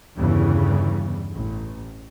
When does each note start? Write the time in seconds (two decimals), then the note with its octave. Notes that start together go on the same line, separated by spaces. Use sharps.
0.17 G1 E2 C#3 E3 G3
1.32 A1